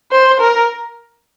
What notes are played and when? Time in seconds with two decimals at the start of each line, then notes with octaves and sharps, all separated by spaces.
0.11 C5
0.40 A#4